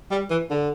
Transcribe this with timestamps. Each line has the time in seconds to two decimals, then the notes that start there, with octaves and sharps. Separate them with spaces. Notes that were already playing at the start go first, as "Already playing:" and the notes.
0.11 G3
0.30 E3
0.51 D3